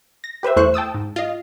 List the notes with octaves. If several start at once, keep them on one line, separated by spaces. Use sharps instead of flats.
A#6
G4 B4 C5 E5
E2 A3 E4 C5 C#6 F#6
G5 A5 D#6 E6
G#2
F4 D#5